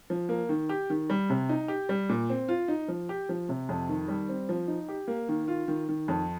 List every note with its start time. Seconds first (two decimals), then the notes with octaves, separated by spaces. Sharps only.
0.10 F3
0.29 A#3
0.49 D#3
0.69 G4
0.90 D#3
1.10 G3
1.30 C3
1.49 D#4
1.68 G4
1.89 G3
2.09 A#2
2.29 C4
2.48 F4
2.68 D#4
2.88 F3
3.09 G4
3.29 F3
3.49 C3
3.69 F2
3.89 D#3
4.08 G3
4.29 C4
4.49 F3
4.68 D#4
4.88 G4
5.08 A#3
5.29 D#3
5.48 F4
5.68 D#3
5.89 D#3
6.08 F2